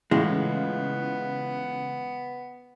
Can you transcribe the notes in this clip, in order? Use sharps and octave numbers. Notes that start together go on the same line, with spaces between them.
A2 C#3 E3 G#3 B3 F4